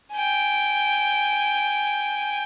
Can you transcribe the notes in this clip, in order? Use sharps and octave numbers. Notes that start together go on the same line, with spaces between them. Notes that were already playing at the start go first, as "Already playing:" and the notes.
G5 G#5